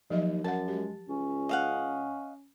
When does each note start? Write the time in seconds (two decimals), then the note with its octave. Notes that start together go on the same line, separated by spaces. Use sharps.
0.10 D#2 F3 F#3 D#5
0.44 F#2 A#4 F#5 A5
0.68 G#3 G4
1.09 C#2 C#4
1.49 D#5 F5 F#5